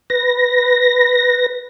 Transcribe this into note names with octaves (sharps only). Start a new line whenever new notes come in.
B4 A#6